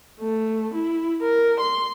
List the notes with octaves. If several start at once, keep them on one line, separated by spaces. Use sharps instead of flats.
A3
E4
A#4
C6